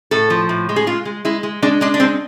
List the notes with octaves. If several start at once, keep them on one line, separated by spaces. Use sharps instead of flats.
A2 A4
F3
A2
G#3
G#4
G#3 F4
G#3
G#3 E4
G#3
G#3 D4
G#3 D4
D4
G#3 C4